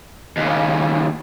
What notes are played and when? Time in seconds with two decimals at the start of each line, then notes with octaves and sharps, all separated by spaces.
0.37 D#2 C#3